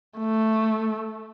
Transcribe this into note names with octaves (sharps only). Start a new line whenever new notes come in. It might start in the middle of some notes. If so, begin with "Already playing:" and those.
A3